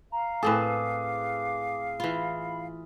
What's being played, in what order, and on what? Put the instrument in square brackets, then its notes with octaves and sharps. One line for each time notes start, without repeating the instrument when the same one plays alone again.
[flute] F5 [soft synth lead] A#5
[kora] A2 C4 A4 [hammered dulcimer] G#4 B4 [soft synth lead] D6
[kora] E3 F4 [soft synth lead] B5